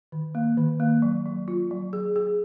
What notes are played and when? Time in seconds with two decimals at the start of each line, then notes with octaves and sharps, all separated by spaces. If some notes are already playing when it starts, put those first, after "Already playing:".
0.12 D#3
0.35 A#3
0.57 D#3
0.80 A#3
1.02 F#3
1.26 F#3
1.48 F4
1.71 F#3
1.93 G#4
2.16 G#4